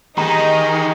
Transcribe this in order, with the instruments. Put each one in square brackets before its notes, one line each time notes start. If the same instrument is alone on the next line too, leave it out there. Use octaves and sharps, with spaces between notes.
[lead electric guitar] D#3 [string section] D#4 [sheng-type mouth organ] G4 G#4 D#5 [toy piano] A#5